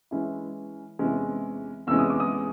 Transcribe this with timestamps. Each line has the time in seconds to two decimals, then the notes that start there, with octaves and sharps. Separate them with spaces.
0.11 E3 G#3 C#4 E4
0.99 E2 C3 E3 G#3 C#4
1.87 E2 C3 E3 G#3 C#4 E6
1.99 D#6
2.10 D6
2.20 D#6